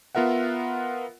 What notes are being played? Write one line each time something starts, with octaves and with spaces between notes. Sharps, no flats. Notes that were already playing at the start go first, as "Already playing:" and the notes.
B3 F4 A#4 E5 F#5